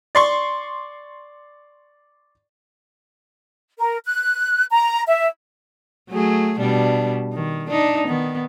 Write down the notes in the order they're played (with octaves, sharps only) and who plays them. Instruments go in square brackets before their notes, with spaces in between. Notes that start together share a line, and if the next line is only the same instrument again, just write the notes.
[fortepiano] D5 C6 C#6
[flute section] A#4
F#6
A#5
E5
[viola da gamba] F#3 A3 G#4
B2 G3 D4
D#3
D4 D#4
D#3 B3